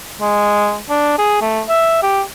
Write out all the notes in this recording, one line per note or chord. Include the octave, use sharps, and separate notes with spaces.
G#3
D4
G#4
A3
E5
G4